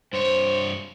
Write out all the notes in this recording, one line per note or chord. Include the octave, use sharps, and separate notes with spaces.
G2 C5 C#5